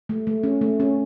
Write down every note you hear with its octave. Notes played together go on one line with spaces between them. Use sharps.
A3
A3
C#4
A3
C#4